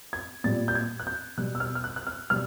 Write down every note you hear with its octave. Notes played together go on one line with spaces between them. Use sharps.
G#6
A#2 G3 A6
G6
G#6
F#6
G6
B2 G3 F#6
E6
F6
F6
F#6
F#6
F6
B2 G3 F6